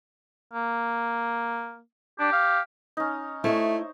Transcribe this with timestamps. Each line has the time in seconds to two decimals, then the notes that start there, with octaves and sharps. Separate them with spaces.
0.53 A#3
2.19 D4 G4
2.33 F5
2.97 C#4 D#4
3.44 A3 E4 C5 C#5 D#5